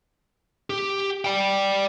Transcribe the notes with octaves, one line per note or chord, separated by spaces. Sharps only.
G4
D5 G5